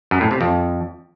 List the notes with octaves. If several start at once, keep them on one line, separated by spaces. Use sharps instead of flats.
F#2
A2
C3
F2